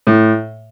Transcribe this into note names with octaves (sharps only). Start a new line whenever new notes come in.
A2